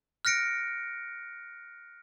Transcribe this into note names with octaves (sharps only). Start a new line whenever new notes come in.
F6 F#6 A#6 C#7 D7